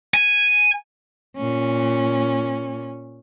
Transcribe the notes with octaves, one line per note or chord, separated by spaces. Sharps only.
G#5
A#2 C#4